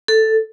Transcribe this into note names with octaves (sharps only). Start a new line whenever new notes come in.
A4